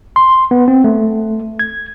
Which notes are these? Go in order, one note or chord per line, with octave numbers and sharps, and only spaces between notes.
C6
B3
C4
A3
G#6